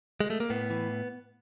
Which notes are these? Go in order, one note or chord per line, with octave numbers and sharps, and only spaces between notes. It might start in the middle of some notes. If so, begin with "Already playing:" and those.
G#3
A3
A#3
A2 B3
E3